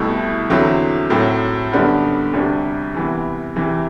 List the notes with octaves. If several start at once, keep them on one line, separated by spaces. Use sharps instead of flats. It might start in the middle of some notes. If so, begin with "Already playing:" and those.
Already playing: C2 B2 A3 E4
E2 D3 F#3 C4 E4
A2 F#3 C4
F#2 D3 G3 B3 D4
D2 C3 G3 D4
C3 E3 B3
E2 C3 E3